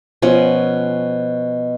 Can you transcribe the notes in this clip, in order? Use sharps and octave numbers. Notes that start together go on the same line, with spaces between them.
B2 F3 C#4 F#5